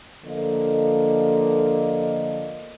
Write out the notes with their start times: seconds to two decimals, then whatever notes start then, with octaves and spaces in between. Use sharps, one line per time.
0.25 D3 F3 A#3 A4 D#5